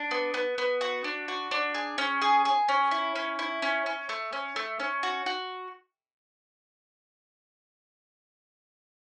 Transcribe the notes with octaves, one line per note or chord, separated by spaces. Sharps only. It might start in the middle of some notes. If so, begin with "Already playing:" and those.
Already playing: D4
B3
B3
B3
F#4
D4
F#4
D4
G#4
C#4
G#4
G#4
C#4
E4
C#4
E4
C#4
C#4
A3
C#4
A3
C#4
F#4
F#4